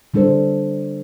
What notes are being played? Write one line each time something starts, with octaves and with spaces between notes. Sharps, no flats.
D3 G3 D4 A4 C5